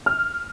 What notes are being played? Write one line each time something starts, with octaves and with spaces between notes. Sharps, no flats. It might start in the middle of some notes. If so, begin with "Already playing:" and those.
F6